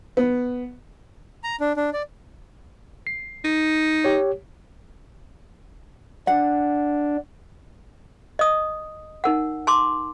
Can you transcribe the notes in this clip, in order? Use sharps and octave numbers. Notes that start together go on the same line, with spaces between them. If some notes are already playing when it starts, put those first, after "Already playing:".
B3
A#5
D4
D4
D5
C7
D#4
G4 C#5
D4 F#5
D#5 D#6
D#4 A#4 F#5
A5 C6 D6